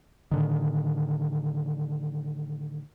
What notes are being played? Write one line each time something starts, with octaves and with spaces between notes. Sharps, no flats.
A2 D3 D#3